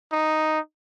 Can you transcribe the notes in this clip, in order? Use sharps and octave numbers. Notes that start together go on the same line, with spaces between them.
D#4